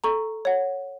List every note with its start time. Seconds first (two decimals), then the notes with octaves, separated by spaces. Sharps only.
0.04 A4 A#5 C#6
0.45 C#5 F#5